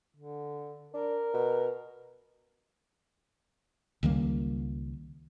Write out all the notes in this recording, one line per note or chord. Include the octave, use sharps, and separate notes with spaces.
D3
D4 A#4
B2
C#2 D#3 G3 A#3